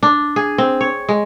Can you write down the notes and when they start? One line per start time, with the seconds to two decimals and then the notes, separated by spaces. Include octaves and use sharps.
0.03 D4
0.36 G#4
0.58 C4
0.81 C#5
1.09 G#3